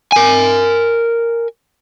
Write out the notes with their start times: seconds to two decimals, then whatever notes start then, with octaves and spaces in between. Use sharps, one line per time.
0.12 A#4 G#5